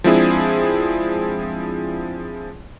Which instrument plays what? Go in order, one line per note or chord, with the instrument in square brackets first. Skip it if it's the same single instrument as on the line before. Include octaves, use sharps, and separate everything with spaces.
[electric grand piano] F3 G#3 C4 D4 E4 G#4